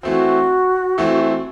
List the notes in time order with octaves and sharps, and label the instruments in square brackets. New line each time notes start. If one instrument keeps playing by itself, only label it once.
[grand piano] E3 A3 C4 [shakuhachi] F#4
[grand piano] E3 A3 C4